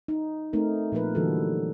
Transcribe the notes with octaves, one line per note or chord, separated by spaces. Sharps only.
D#4
A3 C4 D#4 A#4
A#2 F3 A#3 A#4 B4
D3 E3 F#3 G3 F#4 A4